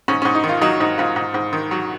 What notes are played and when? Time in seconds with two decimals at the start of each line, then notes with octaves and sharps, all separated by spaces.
0.08 G#2 C#4
0.22 C#4
0.25 G#2
0.35 D#4
0.44 D#3
0.49 F4
0.61 F#3 D#4
0.80 G#2 D#4
0.98 G#2 F4
1.16 G#2
1.34 G#2
1.53 D#3
1.71 F#3